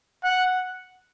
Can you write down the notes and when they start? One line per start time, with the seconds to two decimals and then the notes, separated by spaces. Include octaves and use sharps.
0.24 F#5